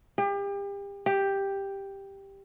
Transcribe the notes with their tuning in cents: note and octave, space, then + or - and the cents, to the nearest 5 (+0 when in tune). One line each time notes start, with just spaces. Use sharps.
G4 +35
G4 +5